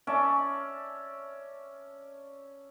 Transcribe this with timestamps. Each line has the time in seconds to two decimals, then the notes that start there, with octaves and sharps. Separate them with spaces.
0.07 C#4 D5 E5 A5